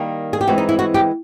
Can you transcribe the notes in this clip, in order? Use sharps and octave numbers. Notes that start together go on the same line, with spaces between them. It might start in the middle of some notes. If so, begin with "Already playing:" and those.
Already playing: D#3 G3 A#3
G#4
G4
E3 G#3 C4 F#4
D#4
E4
F#4
G4